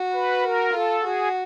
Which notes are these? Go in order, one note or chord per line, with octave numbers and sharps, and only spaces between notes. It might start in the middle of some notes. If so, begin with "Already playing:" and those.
Already playing: F#4
B4
A#4
F4 A4
F#4 G#4